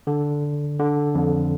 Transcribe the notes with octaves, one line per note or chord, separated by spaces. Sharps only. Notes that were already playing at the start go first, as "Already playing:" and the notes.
D3
D3
F2